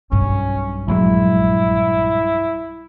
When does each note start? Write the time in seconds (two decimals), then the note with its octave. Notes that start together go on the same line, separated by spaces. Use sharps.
0.12 B1 G2 C#4
0.88 A#1 F#3 G#3 E4